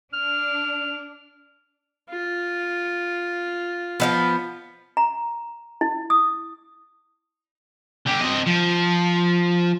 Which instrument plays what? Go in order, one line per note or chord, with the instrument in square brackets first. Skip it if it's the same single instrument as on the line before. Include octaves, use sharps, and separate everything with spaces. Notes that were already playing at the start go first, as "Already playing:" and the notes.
[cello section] D4 [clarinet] F6
[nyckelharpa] F4
[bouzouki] F3 G3 B3
[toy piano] A#5
E4
D#6
[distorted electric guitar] D3 G4
C4 D#5
F3